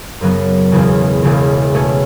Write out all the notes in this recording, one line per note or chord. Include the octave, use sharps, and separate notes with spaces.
F#2 C#3 F#3 B3
E1 E2 C#3
E1 E2 C#3
B2 A3 C#4